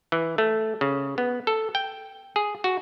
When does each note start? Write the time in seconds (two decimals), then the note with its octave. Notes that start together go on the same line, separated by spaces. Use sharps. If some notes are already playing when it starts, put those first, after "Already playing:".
0.12 E3
0.38 A3
0.81 C#3
1.18 B3
1.47 A4
1.75 G5
2.36 G#4
2.64 F#4